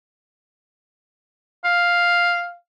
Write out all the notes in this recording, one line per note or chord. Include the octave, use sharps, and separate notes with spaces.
F5